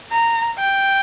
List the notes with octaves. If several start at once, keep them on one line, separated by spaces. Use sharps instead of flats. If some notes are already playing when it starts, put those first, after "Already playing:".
A#5
G5